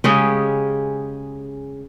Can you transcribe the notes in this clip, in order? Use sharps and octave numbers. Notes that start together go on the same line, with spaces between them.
C#3 G#3 C#4 G4